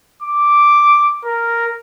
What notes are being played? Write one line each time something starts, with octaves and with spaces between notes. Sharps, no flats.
D6
A#4